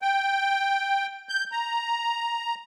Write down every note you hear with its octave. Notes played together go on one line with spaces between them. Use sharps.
G5
G6
A#5